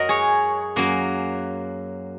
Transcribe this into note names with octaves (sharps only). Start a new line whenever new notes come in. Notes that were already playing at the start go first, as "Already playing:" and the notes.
Already playing: F#2 F#3 A#4 D#5 F#5
G#4 C#5
F#2 F#3 A#3